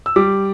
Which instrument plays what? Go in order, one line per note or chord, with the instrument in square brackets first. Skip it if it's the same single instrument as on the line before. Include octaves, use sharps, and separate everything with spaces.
[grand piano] E6
G3 D6